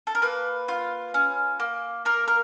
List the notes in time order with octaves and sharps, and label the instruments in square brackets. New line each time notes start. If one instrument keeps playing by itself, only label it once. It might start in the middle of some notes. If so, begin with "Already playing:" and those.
[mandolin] A4
A#4
A#3 B4
F4
C#4
A#3
A#3 A#4
A#4